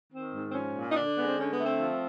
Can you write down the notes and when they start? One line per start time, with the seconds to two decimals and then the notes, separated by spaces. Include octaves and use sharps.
0.12 D#3 C4
0.34 G#2
0.49 C4
0.54 F3 C#4
0.75 A#2
0.90 D#4
0.96 D3 D4
1.17 G#3 B3
1.28 C4
1.38 D3 C#4
1.53 B3
1.59 A3
1.66 C4
1.80 F3